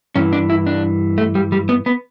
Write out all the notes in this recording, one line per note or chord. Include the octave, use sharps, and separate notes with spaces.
G2 E3 C#4
D4
E4
D4
A3
G3
G3
B3
B3